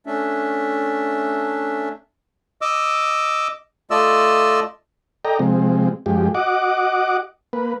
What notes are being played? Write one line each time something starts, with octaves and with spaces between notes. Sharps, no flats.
A3 C#4 D4 E5
D#5 D6 E6
A3 F4 D5 D#5 E6
A4 D5 D#5 G5 A#5
C3 F3 G#3 C4
F#2 F3 G#3 G4
F#4 D#5 F#5 D6
A#3 B4